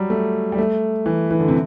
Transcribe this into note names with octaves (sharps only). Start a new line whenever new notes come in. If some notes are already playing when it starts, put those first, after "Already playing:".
Already playing: F#3 G3
A3
G3
A3
E3
E3
D3
C3